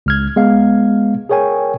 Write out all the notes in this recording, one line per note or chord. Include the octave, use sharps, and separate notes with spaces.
C#2 F6 G#6
G#3 B3 F5
G#4 A#4 C#5 G5 G#5